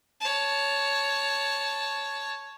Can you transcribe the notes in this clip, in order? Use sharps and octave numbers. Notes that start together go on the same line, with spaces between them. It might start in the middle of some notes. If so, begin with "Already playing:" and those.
C#5 A5